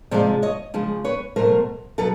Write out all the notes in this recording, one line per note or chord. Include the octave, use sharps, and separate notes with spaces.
C3 F3 G#3 C5 D5
C#5 D#5
C#3 F3 G#3
B4 C#5
B2 F#3 A3 A#4 C5
B2 F#3 A4 B4